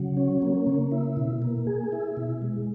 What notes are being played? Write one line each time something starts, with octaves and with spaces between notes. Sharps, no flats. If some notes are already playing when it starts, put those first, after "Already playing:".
Already playing: C#3 F#3
C#4
A#3
C#3
E4
B2
A#3
G#4
E4
B2
G#3